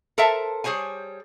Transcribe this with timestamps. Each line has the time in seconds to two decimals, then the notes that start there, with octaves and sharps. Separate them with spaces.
0.18 A4 A#4 C5 E5 A5
0.64 G3 G#4 C5 C#5 G#5